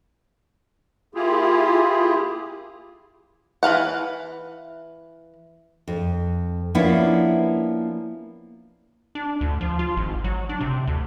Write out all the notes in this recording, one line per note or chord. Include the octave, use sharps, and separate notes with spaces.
A#3 E4 F4 G4 G#4
E3 B4 F5 F#5
F2
F3 A#3 B3 C#4 D4 E4
D4
D2
F3
F4
G#1
F#3
D4
C3
D2